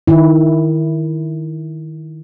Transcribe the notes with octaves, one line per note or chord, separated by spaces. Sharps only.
D#3 E4